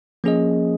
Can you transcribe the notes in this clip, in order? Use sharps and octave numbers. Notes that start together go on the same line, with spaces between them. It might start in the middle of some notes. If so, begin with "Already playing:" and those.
F3 A#3 C#4 G#4 D#5